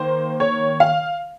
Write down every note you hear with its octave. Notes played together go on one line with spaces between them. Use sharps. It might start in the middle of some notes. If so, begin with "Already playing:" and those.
Already playing: D#3 A#3 C5
C#5
F5